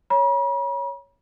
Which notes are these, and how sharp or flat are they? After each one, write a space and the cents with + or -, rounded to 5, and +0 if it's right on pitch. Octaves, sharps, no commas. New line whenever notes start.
C#5 +0 B5 -45